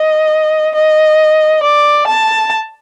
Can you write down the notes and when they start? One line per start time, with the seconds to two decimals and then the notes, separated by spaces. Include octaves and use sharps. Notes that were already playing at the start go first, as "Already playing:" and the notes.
Already playing: D#5
0.75 D#5
1.63 D5
2.07 A5